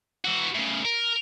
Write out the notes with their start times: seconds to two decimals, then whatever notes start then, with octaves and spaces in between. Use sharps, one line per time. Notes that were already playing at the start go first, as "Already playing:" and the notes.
0.25 E3 F#4
0.55 A2 C#3
0.85 A#4